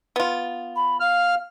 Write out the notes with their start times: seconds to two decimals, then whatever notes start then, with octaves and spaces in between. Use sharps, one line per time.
0.16 B3 F4
0.75 B5
1.00 F5 F6